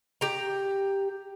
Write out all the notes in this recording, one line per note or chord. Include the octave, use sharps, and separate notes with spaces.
G4 A#5